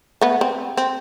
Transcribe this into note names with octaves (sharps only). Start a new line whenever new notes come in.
A3 B3
C4
C4